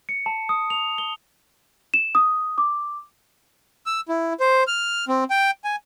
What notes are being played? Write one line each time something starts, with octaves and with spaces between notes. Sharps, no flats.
C#7
A5
D#6
F7
G7
E7
D#6
D6
E6
E4
C5
F6
C4
G5
G#5